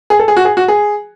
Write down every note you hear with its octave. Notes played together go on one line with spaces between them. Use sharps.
G#4
A4
G#4
F#4
G#4
F#4
G#4